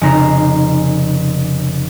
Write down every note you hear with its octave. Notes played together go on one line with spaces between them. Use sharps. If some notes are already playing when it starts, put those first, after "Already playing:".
F1 C#3 D#4 A#5 C7 E7